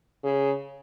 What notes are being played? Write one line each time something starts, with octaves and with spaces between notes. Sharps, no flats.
C#3